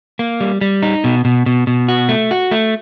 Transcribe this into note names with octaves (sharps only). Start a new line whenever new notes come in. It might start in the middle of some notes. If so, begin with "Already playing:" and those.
A#3
G3
G3
D#4
B2
B2
B2
B2
F#4
A3
F#4
A3